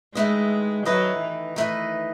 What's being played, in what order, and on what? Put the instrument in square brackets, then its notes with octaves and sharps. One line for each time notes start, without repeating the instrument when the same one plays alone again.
[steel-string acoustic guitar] D#3 A3 E4 B4 D#5 [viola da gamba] G#3
[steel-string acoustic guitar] D#3 A3 E4 B4 D#5 [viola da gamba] F#3
[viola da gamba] E3
[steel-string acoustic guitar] D#3 A3 E4 B4 D#5